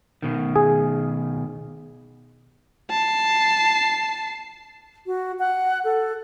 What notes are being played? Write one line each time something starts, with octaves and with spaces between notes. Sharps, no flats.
B2 D#3
G#4
A5 C7
F#4
F#5
A4